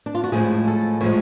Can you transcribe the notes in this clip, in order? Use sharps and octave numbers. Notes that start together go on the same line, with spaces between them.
D4
F4
F#4
A2 F3 G#3 G#4
A4
A2 F3 G#3 C#5